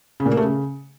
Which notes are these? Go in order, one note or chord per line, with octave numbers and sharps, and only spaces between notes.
C#3
A#2
A#3
A3
C#3